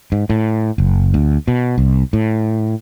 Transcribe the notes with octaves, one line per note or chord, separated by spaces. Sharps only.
G#2
A2
F#1
D2
B2
C2
A2